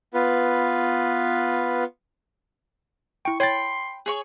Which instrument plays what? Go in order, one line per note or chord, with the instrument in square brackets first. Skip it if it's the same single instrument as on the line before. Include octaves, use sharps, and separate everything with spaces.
[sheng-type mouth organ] B3 F4 B4
[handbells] E4 G5 [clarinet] C#6
[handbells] C#5 A6 [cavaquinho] G5 B5 [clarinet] C6
[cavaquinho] G#4 C#5 C#6